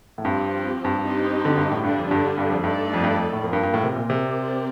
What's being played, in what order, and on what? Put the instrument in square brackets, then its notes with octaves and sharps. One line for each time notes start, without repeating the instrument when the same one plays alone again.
[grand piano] A2
[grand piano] G2 [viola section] F3 C4 G4
[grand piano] G2
[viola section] C4 D#4 G4
[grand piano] D3
G2
A2
[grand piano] G2 [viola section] D3 G3 D4
[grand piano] F2
G2
G2
F2
[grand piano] G2 [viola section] A3 D#4 A4 D5
[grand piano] F2
G2
F2
A2
[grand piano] F2 [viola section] A#3 F4 A#4
[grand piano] G2
G2
A2
C3
A#2
C3
[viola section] C4 G4 A#4 D5